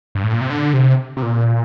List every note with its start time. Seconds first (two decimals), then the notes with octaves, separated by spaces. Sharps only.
0.15 G2
0.24 A2
0.33 A#2
0.41 C3
0.50 D3
0.74 C3
1.17 C3
1.22 A#2